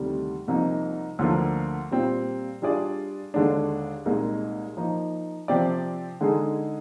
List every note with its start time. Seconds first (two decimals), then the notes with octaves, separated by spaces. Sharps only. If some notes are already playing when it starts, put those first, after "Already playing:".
Already playing: D2 C3 D#3 G3
0.48 C2 C3 F3 A#3 D#4
1.19 D2 D3 F3 A#3 F4
1.91 A#2 G3 C4 F4
2.62 G3 D4 F4 G#4 D5
3.34 D#2 D3 G#3 D4
4.05 C2 A#2 G#3 D#4 A#4
4.77 F3 A#3 D#4
5.48 C3 F3 C4 G4 D5
6.21 D3 G#3 D#4 G#4